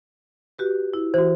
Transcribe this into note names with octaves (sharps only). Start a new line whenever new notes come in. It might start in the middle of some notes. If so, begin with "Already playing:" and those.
F#4 G4 B4
E4
E3 F#4 C5